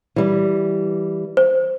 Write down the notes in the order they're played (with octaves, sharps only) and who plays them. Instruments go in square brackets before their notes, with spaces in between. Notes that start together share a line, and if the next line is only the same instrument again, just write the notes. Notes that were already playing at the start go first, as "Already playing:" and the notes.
[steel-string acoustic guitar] E3 G3
[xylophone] C5